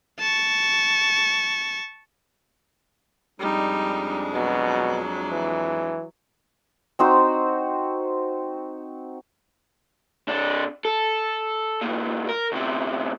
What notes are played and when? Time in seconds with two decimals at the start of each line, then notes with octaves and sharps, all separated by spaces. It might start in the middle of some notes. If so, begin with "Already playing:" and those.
0.20 A5 C#6
3.40 F2 G3 G#3 D4 D#4
4.33 B2 F#3
5.32 E3
6.99 C4 D#4 F#4 C5
10.27 C3 D4
10.85 A4
11.82 G2 A#2
12.29 A#4
12.52 D2 C3